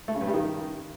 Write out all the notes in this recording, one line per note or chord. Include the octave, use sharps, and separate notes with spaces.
A3
C#3
G2
G3
D#3